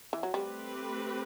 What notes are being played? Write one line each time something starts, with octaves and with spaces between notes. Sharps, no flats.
E3
F#3
G3 A3 C4 G4 B4